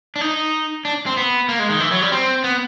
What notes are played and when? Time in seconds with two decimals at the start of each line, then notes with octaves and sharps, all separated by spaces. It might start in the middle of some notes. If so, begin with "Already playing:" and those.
0.16 D4
0.21 D#4
0.85 D4
1.06 C4
1.17 B3
1.49 A#3
1.59 G#3
1.69 D#3
1.80 E3
1.91 F#3
2.02 G3
2.12 C4
2.44 B3